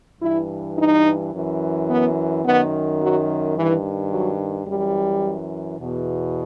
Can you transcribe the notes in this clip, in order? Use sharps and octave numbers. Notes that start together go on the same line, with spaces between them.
G2 E3 E4
D#4
F#2 E3
B3
F#2 D#3 B3
F#3
G2 D#3 E3
F#3
F#2 E3 G3
E2 B2